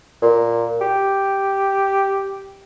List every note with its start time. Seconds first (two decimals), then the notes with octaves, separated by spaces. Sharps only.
0.22 A#2
0.81 G4